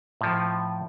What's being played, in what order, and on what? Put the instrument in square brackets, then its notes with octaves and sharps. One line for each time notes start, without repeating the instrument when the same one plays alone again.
[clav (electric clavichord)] A2 F3